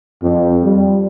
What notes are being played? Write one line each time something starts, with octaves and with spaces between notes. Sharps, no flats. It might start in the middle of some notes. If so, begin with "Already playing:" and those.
F2
G3